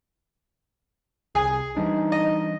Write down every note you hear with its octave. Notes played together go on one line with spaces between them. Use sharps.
C2 G#4 G#5
E3 G3 D4 D#4
D#5